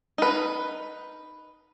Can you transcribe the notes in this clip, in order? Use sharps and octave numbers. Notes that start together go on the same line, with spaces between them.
D#4 B4